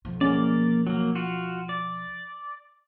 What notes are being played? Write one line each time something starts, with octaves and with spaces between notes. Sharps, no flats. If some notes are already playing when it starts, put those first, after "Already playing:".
B1 F3
A#3 C#4 D5
F#3 A#3
F4 F#4
D5